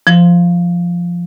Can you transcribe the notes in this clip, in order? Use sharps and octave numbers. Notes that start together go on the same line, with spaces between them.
F3